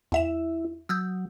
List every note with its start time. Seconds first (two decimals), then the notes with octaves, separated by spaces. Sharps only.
0.12 E2 E4 E5 E7
0.89 F#3 D#6 E6 G6